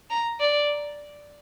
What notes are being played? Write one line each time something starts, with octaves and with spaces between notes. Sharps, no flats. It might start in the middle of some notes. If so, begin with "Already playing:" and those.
A#5
D5